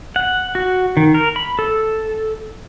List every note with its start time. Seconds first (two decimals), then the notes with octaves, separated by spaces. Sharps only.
0.16 F#5
0.55 F#4
0.97 D#3
1.14 A#4
1.36 B5
1.59 A4